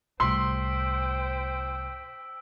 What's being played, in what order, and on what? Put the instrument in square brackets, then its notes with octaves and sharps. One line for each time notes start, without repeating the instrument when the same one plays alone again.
[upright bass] C2 A2 [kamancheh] C5 G5 [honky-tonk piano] C6 [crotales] E6 B6 D7